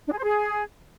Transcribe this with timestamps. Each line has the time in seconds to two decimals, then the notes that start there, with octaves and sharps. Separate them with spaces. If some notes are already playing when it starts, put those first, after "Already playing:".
0.07 D4
0.12 G#4
0.18 C5
0.24 G#4